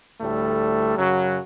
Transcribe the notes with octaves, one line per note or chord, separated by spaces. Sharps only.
D2 A2 G3 A3
F#2 C#3 F#3